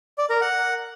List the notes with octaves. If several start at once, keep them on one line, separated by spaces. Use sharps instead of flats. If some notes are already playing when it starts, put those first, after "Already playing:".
D5
A#4
F#5